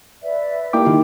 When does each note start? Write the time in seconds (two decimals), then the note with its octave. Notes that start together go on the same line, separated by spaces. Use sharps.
0.23 B4 D5 E5
0.73 A#3 E4 G4 G5 D6
0.85 D#3 E4 F4